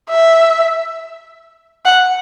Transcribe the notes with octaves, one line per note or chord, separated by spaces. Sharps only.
E5
F#5